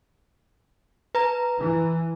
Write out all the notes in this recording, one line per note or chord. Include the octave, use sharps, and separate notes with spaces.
B4 A#5
E3